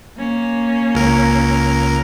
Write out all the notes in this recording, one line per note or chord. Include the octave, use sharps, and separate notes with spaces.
A#3 C#4
C#2 A#4